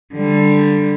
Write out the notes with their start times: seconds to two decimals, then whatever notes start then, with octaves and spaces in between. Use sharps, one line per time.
0.14 D3 G3